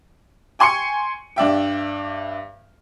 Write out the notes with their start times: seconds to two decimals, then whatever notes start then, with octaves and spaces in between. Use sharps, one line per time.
0.59 G5 G#5 C6 C#6 C#7
1.36 G2 D5 E5 G5